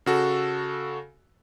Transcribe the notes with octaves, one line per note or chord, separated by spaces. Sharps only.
C#3 F#4 A4